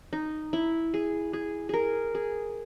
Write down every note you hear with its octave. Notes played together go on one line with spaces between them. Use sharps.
D#4
E4
G#4
G#4
G#4 A#4
G#4